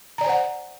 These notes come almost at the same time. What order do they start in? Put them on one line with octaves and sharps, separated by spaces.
A#5 D5 G#5 C5 F#5